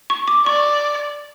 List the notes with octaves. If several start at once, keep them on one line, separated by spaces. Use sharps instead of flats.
C#6
D6
D5 C#6